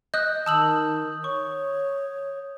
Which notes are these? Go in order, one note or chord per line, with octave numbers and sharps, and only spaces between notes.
D#5 D#6 F#6 G6
D#3 A5 D#6 E6 F#7
C#5 C#6